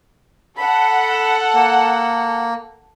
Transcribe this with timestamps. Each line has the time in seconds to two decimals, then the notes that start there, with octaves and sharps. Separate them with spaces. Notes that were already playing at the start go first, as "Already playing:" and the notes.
0.57 A4 F#5 B5
1.54 A#3